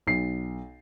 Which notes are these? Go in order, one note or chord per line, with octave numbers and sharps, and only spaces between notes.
B1 C7